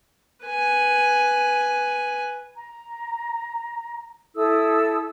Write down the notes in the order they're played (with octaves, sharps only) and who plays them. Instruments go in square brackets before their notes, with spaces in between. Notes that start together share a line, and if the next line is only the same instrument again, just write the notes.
[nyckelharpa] B4 G#5
[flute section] A#5
E4 A4 D#6 E6